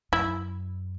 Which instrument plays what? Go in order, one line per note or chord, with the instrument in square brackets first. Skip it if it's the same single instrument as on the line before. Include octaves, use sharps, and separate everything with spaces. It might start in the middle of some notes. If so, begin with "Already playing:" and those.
[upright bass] F#2 [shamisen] E4